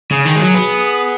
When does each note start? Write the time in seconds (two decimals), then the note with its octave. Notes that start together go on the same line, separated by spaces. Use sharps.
0.11 C#3 G#4
0.26 D#3
0.36 G#3
0.41 F#3
0.55 B3